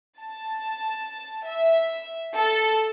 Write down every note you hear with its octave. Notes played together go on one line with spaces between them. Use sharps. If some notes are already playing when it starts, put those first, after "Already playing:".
A5
E5
A4